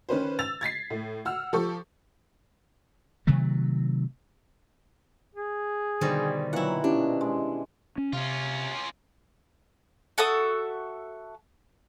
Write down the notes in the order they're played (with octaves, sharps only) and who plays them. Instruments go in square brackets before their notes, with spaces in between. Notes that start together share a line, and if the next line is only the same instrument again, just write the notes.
[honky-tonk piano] D#3 C#4 B4 C5
E6 A6 F7
G#6 A6 B6 C7
A2
F#5 E6 F6
F3 G4 A4 C#6
[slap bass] C3 D#3 F#3 A3
[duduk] G#4
[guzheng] B2 D#3 G3 [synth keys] D3 [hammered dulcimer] C5 D5
[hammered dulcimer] A#2 D#3 E3 [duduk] F#3 [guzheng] E4 F#5
[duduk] B2 [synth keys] C#4 E4 G4 [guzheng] D4
[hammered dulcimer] G#3
[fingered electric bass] C#4
[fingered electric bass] C3 [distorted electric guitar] C#4 F4
[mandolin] F#4 A4 E5 D#6